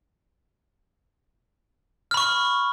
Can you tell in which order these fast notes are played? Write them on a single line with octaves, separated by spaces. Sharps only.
F6 B5 C#6